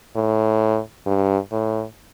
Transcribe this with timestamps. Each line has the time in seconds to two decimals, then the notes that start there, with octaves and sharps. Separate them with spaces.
0.16 A2
1.06 G2
1.52 A2